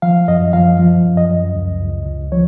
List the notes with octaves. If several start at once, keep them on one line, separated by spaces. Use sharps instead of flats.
F3 F5
F#2 D#5
F3 F5
F3
F#2
D#5
F#2
C#2
C#2
C#2
F3 C#5